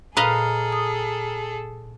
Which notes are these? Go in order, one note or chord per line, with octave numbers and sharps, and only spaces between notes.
A#2 G#4 A4 B4 D#5 F5 A#5 F6
D#6